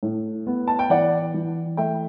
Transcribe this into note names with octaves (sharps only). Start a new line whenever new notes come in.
A2
B3
A5
G5
E3 D5 F#5
E3
A3 E5 G5